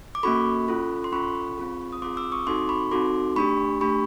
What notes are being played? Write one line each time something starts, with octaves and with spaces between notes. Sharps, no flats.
D6
A#3 C#4 F#4 A4 B5 C#6
C#4 F4 A4
C6
C#4 F4 A4 B5 C#6
C4 F4 G#4
D#6
C4 F4 G#4 C6 D6
D6 E6
C#6 D#6
C4 D#4 F#4 A4 C6 D6
B5 C#6
C4 D#4 F#4 A4 C6 D6
A3 D4 G4 B5 C#6
A3 D4 G4 B5 C#6